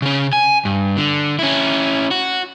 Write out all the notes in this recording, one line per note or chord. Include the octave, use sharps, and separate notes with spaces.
C#3 C#4
G#5
G2
D3
C#4 E4
F#4